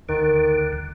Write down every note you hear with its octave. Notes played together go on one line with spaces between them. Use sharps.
D2 D3 D#3